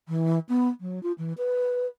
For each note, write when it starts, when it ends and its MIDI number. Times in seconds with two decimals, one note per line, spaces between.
0.08 0.39 52
0.49 0.69 59
0.81 1.02 54
1.03 1.12 65
1.18 1.33 52
1.38 1.87 71